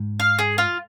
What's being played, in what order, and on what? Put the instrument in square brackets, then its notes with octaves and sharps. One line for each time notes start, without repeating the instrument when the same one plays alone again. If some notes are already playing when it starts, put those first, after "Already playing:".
Already playing: [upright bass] G#2
[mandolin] F5
G#4
F4